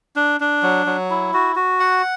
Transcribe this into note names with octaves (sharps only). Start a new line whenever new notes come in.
D4
D4
F#3
F#3
E4
F#4
F#4
F#5